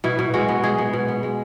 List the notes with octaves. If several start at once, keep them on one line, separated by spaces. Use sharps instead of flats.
B2 E4
B2
G#3 F#4
B3
G#3 G#4
B3
B2
B3
G#3